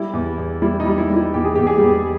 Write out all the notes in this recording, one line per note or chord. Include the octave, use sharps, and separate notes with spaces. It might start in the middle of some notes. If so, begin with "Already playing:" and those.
Already playing: G3 E4
E2
E2
G3 E4
D#4
G3
E4
G3
E4
E2 G4
G#4
E2 G4
G#4
E2 G3 G4